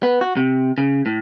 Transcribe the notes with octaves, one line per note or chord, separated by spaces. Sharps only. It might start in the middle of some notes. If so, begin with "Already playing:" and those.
B3
F#4
C3
C#3
A2